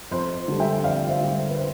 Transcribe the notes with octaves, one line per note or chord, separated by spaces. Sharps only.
F2 C5
D3 G3
E5 G5
F2 D5 F5
C5 E5
D3 G3
B4
C5